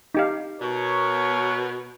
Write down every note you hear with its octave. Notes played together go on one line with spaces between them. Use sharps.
D#4 G4 F5
B2 A#4 C#5